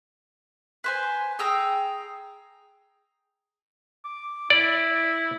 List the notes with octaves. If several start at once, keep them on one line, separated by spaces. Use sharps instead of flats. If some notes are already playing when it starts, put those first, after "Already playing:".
B4 C5 G#5
G#4 G5 A#5 E6
D6
E4 D5